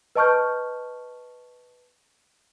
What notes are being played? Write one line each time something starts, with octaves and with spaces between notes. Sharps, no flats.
B4 D#5 A5 C#6 F6 G6